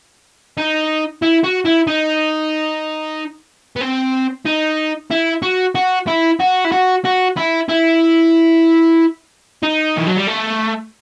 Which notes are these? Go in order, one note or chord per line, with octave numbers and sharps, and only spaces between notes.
D#4
E4
F#4
E4
D#4
B3
C4
D#4
E4
F#4
F#4
E4
F#4
E4
F#4
F#4
E4
E4
D#4
E3
F#3
G3
A3